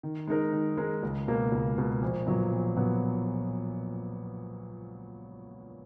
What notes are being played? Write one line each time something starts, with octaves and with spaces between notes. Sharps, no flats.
D#3
G#3 D#4 A#4
D#3
G#3 D#4 A#4
C#2
B2 A#3
C#2
B2 A#3
A#1
A#2 F#3 B3
A#1
A#2 F#3 B3